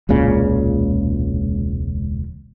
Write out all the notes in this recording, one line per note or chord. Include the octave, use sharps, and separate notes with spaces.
E1 C#2 A#2 C#3